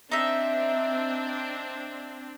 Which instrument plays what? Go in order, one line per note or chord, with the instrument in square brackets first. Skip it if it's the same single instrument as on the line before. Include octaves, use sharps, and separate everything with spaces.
[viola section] C4 D4 [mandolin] D#4 E5